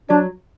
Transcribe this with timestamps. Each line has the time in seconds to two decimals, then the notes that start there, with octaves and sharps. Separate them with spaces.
0.10 F#3 D4